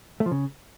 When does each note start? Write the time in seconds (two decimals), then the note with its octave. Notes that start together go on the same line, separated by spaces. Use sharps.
0.20 A3
0.26 F3
0.31 C#3